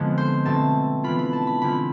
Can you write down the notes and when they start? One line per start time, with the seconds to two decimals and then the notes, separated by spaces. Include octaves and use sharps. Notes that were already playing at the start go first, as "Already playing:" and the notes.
Already playing: F2 D3 F3 G#3 B3
0.18 C5
0.45 B2 A3 C4 A5
1.04 E3 B3 D4 F4 B5
1.19 B5
1.33 A5
1.47 B5
1.62 D3 G#3 C4 F4 B5